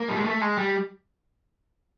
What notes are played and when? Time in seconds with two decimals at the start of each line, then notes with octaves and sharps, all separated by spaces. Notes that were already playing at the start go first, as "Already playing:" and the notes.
Already playing: A#3
0.09 G3
0.16 G#3
0.24 A3
0.41 G#3
0.58 G3